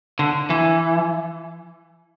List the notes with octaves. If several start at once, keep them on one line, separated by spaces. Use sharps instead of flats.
D3
E3